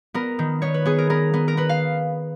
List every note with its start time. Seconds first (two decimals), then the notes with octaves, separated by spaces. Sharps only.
0.14 B3 A#4
0.39 D#3
0.62 B3 C#5
0.74 B4
0.85 B3 G#4
0.98 A#4
1.10 B3 A#4
1.34 B3
1.48 A#4
1.57 B3 B4
1.69 F5